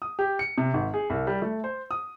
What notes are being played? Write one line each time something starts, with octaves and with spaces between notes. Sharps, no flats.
D#6
G4
C#7
C3
G#1
G#4
C2
G3
A3
C5
D#6